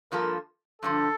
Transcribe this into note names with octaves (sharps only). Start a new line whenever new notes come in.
G2 F3 A#3 F4 A4 A#4
G2 D3 F3 A4